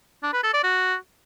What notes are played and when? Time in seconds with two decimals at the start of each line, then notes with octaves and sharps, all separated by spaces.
0.23 D4
0.33 B4
0.43 A4
0.54 D5
0.64 F#4